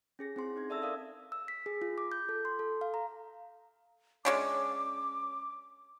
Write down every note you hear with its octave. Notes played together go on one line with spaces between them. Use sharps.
C#4 G#4 A#6
C4 E4 G#4 C6
C4 D#4 C6 G#6
A4 D5 E5 A5 E6
A#4 D5 F5 D#6
E6
B6
G#4
F4
D6
G6
A4
C6
A4
F5
A#5
G#3 C#4 D4 D6